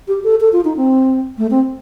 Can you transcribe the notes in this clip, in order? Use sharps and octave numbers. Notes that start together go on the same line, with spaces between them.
G4
A4
A4
F4
D#4
C4
A3
C4